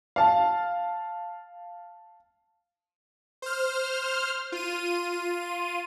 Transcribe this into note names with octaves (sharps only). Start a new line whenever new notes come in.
F5 A5
C5 F6
F4 D#7